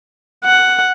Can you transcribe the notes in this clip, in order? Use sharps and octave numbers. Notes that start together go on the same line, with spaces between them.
F#5